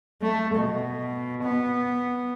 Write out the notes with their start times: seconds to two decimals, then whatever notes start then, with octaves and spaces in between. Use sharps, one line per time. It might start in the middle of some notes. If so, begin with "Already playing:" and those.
0.22 A3
0.56 B2
1.43 B3